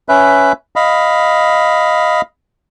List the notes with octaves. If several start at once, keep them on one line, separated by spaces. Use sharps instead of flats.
C#4 B4 E5
D#5 F5 B5